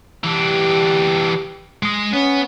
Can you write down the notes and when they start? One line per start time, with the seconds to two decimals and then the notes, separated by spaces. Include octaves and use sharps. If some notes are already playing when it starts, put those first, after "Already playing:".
0.24 E3 D4 G4
1.83 G#3 D#5
2.13 B3 C#4